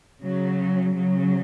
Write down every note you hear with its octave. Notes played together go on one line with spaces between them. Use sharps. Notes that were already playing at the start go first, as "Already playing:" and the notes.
C#3 F#3
C#3 F#3